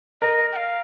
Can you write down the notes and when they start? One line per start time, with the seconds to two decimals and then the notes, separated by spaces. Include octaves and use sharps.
0.22 A#4 D#5
0.52 G5
0.56 F5